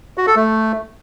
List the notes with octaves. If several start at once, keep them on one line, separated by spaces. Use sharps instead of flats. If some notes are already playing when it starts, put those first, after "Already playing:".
F#4
A4
A3